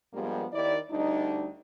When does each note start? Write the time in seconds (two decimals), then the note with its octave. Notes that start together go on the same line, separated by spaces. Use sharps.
0.13 G2 F3 G3 G#3 A#3 B3
0.53 D#2 D#3 E4 D5
0.90 D2 G3 D4 D#4